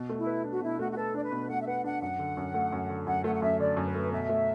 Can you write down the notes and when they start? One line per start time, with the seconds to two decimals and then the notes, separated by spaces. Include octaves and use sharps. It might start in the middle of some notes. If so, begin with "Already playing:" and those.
Already playing: B2
0.09 A3
0.18 E4
0.26 B4
0.44 D4
0.51 F#4
0.61 B2 E4
0.79 A3 F#4
0.91 F#4
0.96 A4 B4
1.14 D4 D5
1.23 B4
1.31 B2
1.49 A3 F#5
1.60 E5
1.67 B4 F#5
1.84 D4 F#5
2.02 F#2 F#5
2.19 D3
2.37 F#2
2.54 A3
2.72 F#2
2.90 D3
3.07 F#2 F#5
3.24 A3 F#5
3.35 F#5
3.42 F#2 E5
3.60 D3 D5
3.77 F#2
3.86 B4
3.95 A3
4.11 B2 E5
4.29 A3